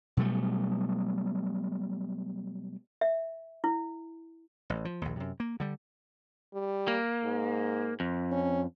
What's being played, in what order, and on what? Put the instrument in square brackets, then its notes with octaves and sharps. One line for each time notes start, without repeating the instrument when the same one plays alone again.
[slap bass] B2 F#3 G3 A3
[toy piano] E5
E4
[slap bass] A1
F3
A#1 D#2
F#2 C3
A#3
D3 G3
[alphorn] G3
[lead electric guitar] A#3
[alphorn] G#2
[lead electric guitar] F2
[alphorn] C#4